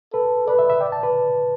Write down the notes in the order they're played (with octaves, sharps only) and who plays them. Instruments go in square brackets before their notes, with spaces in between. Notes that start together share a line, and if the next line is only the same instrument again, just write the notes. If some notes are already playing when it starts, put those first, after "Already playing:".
[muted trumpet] A4 [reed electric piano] B4
[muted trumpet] B4 [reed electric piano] D5
[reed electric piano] E5
E5
[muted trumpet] D5 [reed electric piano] G5
[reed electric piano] A5
B4